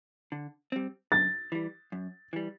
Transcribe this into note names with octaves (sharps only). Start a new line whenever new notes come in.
D3
G3 C4
F#2 A6
E3 G3
F#2
E3 G3